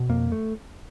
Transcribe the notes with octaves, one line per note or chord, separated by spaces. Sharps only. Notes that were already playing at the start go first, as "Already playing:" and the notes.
Already playing: B2
F2 A#3
A3